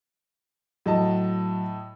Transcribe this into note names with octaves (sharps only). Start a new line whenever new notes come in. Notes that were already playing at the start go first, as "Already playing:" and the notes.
A2 F#3 D#5 A5